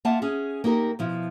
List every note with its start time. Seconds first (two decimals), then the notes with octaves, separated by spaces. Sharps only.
0.05 A#3 F4 E5 F#5 A5
0.22 C#4 G#4
0.64 A#3 D#4 G4 A#4
0.99 B2 F3 E4